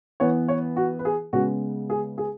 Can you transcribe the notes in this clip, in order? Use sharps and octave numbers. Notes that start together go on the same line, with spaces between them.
E3 B3 C#5
C#5
F#4
B4
G#4
C#3 G#3 B3 F#4
G#4
G#4